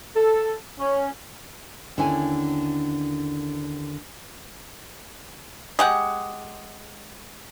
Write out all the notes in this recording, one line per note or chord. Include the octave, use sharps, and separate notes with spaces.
A4
C#4
D#2 D3 C#4 E4 G#5
G#3 G4 F#5